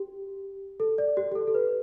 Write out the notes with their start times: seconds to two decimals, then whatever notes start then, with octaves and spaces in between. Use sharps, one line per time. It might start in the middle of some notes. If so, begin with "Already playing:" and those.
Already playing: G4
0.80 A4
0.98 D5
1.17 G4
1.32 G4
1.35 A4
1.47 A4
1.54 B4